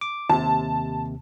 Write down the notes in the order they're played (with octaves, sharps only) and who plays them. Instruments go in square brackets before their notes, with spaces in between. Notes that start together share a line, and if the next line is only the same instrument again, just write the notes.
[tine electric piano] D6
[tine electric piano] D#2 C3 [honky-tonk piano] A5